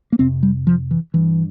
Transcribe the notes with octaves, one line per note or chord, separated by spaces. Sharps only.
A#3
F2 C3 C4
G3
F3
E3
G2 E3